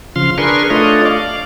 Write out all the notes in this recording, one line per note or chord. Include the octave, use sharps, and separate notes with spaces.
C#3 F3 F5 C6
D4 G#4 A#4 B4 C6 C#6
A3 D4 F4 C#5 D#5
D5 F5